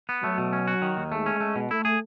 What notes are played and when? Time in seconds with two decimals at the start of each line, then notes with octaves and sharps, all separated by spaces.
0.09 B3
0.23 F#3 A3
0.38 B2
0.53 C#4
0.67 F#4
0.82 D#3
0.97 D#2
1.12 G#3 A3
1.26 C#4
1.40 A3
1.56 B2
1.71 A3 E4
1.85 G#4